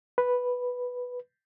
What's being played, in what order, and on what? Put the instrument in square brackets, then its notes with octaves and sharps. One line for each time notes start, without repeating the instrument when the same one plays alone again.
[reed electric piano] B4